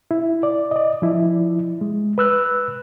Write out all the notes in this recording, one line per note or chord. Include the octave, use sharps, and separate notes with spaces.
E4
D5
D5 D#5
F3 E4
G#3
B4 E6 F#6